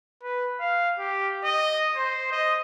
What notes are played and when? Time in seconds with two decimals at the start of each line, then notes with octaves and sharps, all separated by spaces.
0.23 B4
0.60 F5
0.99 G4
1.44 D#5
1.96 C5
2.32 D#5